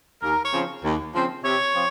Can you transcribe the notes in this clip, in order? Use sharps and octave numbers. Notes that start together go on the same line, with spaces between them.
D#2 A#4
C#5
C#3 F3 C4
D#2
C#3 F3 C4
C3 C#5
F3 C4